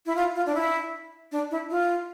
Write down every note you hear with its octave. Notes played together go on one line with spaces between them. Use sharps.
E4
F4
F4
D4
E4
D4
E4
F4